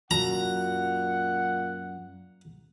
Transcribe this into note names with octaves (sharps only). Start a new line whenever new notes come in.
F#2 A#2 F#4 F#5 A5 A#5